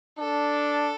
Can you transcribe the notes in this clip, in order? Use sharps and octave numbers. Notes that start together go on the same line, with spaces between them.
D4 A4